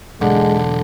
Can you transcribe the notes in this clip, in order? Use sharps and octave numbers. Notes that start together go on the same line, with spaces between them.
B1 E2 D3 G#3